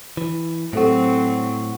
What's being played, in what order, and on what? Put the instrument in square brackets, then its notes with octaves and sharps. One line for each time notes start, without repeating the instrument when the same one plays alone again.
[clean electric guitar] E3
[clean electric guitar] A2 F#4 [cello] F#3 C4 [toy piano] G4 A4 C5